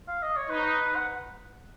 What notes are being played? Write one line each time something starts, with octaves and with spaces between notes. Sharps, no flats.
F5
D#5
C#5
D#4 B4
F#5